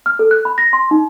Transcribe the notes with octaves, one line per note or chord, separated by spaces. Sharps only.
F6
A4
F#6
B5
A#6
C6
D#4